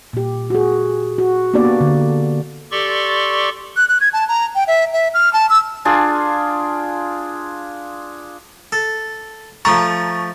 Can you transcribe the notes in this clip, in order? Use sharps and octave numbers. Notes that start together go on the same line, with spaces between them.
A#2 G4
F#4 G#4
F#4
A#3 B3 D4 F#4 G4 D5
D3
G4 A4 D5 C6 C#6
F#6
F#6
G#6
A5
A#5
G5
E5
E5
F6
A5
E6
D4 F4 G#4
A4
F3 A3 A5 A#5 C#6